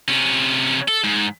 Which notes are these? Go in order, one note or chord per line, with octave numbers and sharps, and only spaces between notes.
C3 C#4
A4
G#2